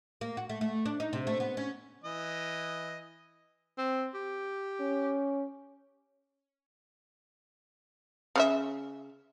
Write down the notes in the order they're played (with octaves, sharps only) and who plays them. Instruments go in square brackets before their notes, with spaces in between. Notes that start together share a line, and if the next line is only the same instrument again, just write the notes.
[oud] A#3
F#4
A3
A3
D4
D#4
C3
A3
B3
C#4
[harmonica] E3 D#5
[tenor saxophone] C4
G4
[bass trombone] C#4
[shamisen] C#3 C#4 E5